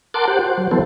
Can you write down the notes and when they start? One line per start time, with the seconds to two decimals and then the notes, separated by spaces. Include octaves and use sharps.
0.14 A#4 F#5 A5 C6 D6
0.28 G4 C5 F#5
0.39 F#4 C5
0.58 F#3
0.71 E3 F#3 B3 A4 C5